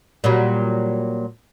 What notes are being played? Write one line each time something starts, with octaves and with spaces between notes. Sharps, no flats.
A#2 F#3 G3